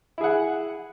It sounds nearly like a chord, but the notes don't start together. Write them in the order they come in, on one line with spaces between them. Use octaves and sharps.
E4 G#4 F#5